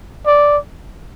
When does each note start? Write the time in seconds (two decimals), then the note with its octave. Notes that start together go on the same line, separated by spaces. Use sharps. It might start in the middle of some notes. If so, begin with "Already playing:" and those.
0.26 D5